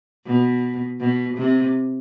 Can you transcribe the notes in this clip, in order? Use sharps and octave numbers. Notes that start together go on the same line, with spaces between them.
B2
B2
C3